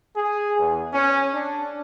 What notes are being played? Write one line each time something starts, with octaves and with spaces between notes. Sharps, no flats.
G#4
E2
C#4
D4